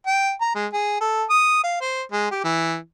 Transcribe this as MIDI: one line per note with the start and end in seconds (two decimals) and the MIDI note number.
0.06 0.31 79
0.41 0.53 82
0.55 0.66 56
0.73 0.97 68
1.01 1.24 69
1.30 1.59 87
1.64 1.80 77
1.81 2.02 72
2.12 2.30 56
2.31 2.42 67
2.44 2.76 52